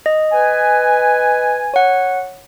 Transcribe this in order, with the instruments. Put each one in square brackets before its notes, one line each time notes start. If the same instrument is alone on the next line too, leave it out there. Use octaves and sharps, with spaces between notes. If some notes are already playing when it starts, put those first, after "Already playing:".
[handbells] D#5
[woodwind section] B4 G#5
[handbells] C#5 F#5